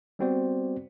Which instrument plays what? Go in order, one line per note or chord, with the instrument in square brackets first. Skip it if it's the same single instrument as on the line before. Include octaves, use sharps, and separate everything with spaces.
[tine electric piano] G3 B3 C4 F#4 C5 D5